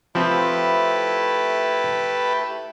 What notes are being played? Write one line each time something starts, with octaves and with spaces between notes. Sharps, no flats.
F3 A3 C4 E4 G4 A4 B4